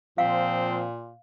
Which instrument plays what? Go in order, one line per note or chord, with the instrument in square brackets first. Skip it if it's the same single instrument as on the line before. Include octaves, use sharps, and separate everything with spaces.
[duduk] A#2 [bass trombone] F3 [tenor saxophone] C4 [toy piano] F5